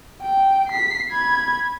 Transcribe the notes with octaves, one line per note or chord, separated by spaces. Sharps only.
G5
B6 C7
B5 G#6